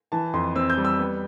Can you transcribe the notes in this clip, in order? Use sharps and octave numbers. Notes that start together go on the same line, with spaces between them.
E3 A5
F2 C6
C4 E6
G6
G3
E6
B3